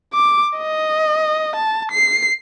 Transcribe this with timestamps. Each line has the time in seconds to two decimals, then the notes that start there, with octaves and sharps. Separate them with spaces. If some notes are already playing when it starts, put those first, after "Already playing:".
0.14 D6
0.58 D#5
1.55 A5
1.91 C7